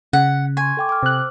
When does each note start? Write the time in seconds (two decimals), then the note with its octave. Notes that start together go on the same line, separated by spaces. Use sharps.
0.13 C#3 F#5
0.57 G#5 C6 C#6
0.77 A4 G5 D6
0.89 D6 F6
1.03 C3 C5 E6 F#6